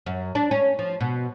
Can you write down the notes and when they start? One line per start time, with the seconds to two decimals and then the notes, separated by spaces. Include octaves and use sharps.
0.06 F#2
0.35 D4
0.51 C#4
0.79 F3
1.01 B2